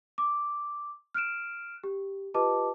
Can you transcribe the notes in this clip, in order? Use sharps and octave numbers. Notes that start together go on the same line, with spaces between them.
D6
F6 F#6 D7 E7
G4
F4 G4 B4 D#5 A5 D6